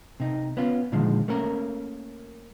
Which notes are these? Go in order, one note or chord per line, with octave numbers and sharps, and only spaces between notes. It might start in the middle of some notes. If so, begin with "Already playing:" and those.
C3 D#4
B3 C#4 F4
A#2 D3 D#3 F3 G#3
A3 A#3 C#4 A#4